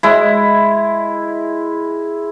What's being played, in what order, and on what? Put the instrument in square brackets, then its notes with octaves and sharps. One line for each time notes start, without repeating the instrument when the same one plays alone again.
[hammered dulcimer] G#3 E4